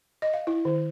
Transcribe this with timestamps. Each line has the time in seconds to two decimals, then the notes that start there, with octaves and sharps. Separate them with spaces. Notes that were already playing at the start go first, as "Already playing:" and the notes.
0.22 D#5
0.34 F5
0.47 E4
0.65 D#3